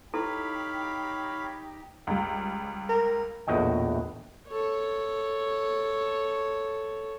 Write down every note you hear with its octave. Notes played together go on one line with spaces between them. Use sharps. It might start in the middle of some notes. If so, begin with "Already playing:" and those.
D#4 E4 G4 A4 C#5 F5 B5
C#2 G3
A#4
A#1 E2 A2 F#4 D#5 G5
A4 C#5